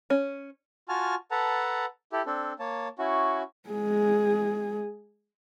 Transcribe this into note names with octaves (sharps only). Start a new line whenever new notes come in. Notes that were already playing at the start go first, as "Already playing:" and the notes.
C#4
F4 F#4 G#5 A5 F6
A4 B4 F#5 A5 A#5
E4 G4 A4
C4 D4 A4
A#3 C#5 A5
C#4 E4 F#4
G#3 G#4